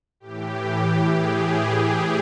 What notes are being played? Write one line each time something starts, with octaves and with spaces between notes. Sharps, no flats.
A2 E3 G4
G#4